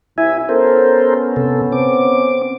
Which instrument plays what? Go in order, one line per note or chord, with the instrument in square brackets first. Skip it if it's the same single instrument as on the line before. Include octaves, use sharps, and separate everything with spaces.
[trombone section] C2 [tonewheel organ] E4 E5 G#5
[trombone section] B3 C#4 [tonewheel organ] A4 A#4 C5
[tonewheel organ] C3 A4
C4 D6